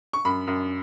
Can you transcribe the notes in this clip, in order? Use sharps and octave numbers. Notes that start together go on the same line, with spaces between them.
C#6
F#2 B5
F#2